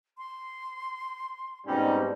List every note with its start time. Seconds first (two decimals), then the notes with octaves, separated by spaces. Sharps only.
0.18 C6
1.67 G#2 B2 G3 C4 C#4 D#4